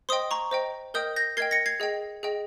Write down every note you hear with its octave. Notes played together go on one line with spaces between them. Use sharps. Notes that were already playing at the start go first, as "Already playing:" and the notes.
C5 D#5 G5 C6 D#6
A#5 C#6
C5 D#5 G5
A#4 D#5 G5 D#6 G6
G6 A#6
A#4 D#5 G5 G#6 C7
A#6 C#7
G#6 C7
G#4 D#5 G5
G#4 D#5 G5